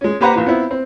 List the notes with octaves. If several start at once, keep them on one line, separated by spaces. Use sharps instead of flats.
G#3 C#4
A#3 G4 B4 C5 F#5 A#5
A#1 E3 B4
B3 C4 E4
C4